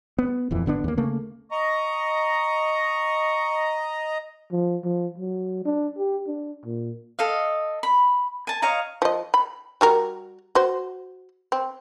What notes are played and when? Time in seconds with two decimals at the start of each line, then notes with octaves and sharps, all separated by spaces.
0.18 B3
0.51 D#1 F2 E3
0.66 G#1 D3 B3 D4
0.84 D#2 A#3
0.97 C#3 A3 A#3
1.51 D#5 A#5 C#6
4.52 F3
4.85 F3
5.18 F#3
5.65 D4
5.98 G4
6.27 D4
6.65 A#2
7.19 A4 D#5 F5
7.83 B5
8.47 G#5 A5
8.62 C#5 D#5 F5 A#5
9.02 F3 D#5
9.34 B5
9.81 G3 F#4 A#4
10.55 F#4 C5
11.52 C4